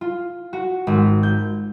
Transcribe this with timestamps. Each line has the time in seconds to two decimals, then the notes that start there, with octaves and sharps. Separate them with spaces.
0.01 F4
0.53 F#4
0.87 G#1
1.23 G6